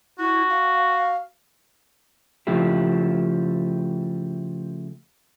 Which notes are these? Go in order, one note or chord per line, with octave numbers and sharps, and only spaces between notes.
E4 F#4
F5
C#3 F3 A3 E4 G4